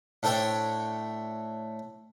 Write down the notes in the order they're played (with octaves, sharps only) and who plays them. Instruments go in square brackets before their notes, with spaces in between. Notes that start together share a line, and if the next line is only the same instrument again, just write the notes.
[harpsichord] A2 D4 A4 C5 C#5 G5